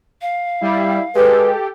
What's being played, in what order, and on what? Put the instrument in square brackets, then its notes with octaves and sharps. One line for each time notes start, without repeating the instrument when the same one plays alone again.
[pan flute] F5
[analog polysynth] G3 [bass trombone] E4
[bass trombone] G#3 [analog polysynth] G4 A4 [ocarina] B4